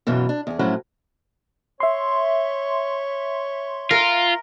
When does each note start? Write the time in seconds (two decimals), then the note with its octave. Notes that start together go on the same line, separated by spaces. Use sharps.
0.07 F#2 B2 E3 F4
0.29 D4
0.47 E2 G#4
0.59 A2 F3 F#3 C#4 E4 F#5
1.80 C#5 E5 C6
3.91 F4 A#4